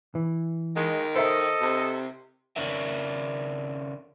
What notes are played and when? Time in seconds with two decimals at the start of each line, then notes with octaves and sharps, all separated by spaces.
0.15 E3
0.76 D#3 G#3
1.16 A4 C5 D#5 E5 A#5
1.61 C3
2.56 C#3 C#4 D4 A#4 E5